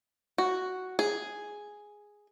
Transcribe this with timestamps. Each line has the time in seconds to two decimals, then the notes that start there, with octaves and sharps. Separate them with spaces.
0.38 F#4
0.99 G#4